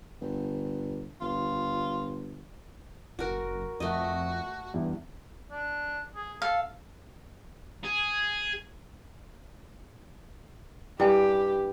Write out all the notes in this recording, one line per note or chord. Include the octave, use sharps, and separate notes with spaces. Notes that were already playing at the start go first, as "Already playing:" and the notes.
G1
G1 F4
F#1 F#4 A#4
F2 A3 F#4 D#5
E2 G2
D4
G#4
A4 F5
G#4
G2 E4 G4 B4 G5 G#5